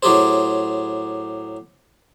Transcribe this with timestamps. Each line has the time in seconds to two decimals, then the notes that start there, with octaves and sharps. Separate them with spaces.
0.03 A2 F#3 G4 G#4 C5